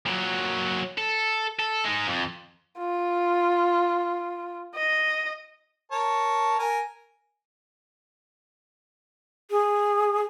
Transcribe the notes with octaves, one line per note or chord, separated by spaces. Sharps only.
A#2 F#3
A4
A4
G#3 D#4
F2
F4
D#5
A#4 C#5 A5
A#4 G#5
G#4